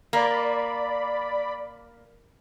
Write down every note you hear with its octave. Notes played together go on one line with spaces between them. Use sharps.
A#3 D5 B5